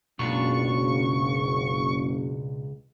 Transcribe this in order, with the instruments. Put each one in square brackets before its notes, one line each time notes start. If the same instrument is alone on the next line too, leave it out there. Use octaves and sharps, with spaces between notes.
[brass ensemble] F#1 [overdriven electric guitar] C#2 [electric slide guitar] B2 D4 F4 [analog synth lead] C#6